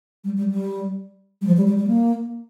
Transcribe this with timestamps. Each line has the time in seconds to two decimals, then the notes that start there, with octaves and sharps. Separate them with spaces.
0.24 G3
0.37 G3
0.51 G3
1.41 G3
1.47 F3
1.57 G3
1.67 G3
1.77 G3
1.87 A#3